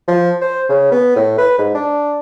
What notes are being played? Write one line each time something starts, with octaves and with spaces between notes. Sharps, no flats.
F3
C5
C#3
B3
A2
B4
G#2
D4